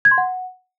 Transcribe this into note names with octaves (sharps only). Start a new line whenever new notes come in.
G#6
C6
F#5